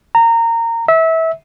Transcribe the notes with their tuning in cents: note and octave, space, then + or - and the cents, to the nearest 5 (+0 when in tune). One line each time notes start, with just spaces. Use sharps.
A#5 -20
E5 -25